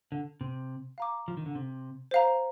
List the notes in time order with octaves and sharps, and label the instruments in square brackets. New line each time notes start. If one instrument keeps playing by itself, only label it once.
[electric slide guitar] D3
C3
[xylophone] F5 A#5 D6
[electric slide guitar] F3
D#3
D3
C3
[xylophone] C5 F5 A#5